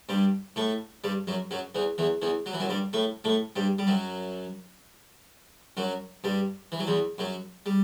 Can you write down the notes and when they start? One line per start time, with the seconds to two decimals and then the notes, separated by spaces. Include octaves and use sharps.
0.09 G2 G3
0.56 A2 A3
1.04 G2 G3
1.27 F#2 F#3
1.51 F#2 F#3
1.75 E2 E3
1.98 E2 E3
2.22 E2 E3
2.46 F#3
2.53 E3
2.60 F#2 F#3
2.69 G2 G3
2.93 A2 A3
3.24 A2 A3
3.56 G2 G3
3.79 G3
3.87 F#2 F#3
5.77 F#2 F#3
6.24 G2 G3
6.72 E3
6.79 F#3
6.87 E2 E3
7.18 F#2 F#3
7.66 G3